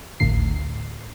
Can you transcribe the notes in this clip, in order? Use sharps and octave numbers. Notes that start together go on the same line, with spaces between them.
G#1 D2 A2 D3 C7